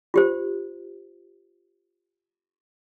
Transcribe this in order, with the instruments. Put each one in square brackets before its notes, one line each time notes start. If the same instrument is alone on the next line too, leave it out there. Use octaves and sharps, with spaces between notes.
[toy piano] F4 G4 C5